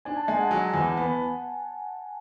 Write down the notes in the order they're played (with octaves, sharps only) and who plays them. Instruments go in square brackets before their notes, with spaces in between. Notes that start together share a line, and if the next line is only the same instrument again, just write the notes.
[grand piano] D4 [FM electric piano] G#5
[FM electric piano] A5
[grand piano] G#3 [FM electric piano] G#5
[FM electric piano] F#5
[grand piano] F#3 [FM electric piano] G#5
[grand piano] E2
B3